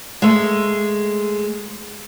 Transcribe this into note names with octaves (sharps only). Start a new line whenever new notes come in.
G#3 A3